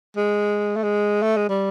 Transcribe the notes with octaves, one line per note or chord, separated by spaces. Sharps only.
G#3
A3
G#3
A3
G#3
G3